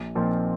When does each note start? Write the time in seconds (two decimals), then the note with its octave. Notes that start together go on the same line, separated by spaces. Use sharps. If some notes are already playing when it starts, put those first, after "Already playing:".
Already playing: A#1
0.15 A#2 F3 C4 D#4